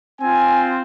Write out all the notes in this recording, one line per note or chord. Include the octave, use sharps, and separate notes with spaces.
C4 F4 G#5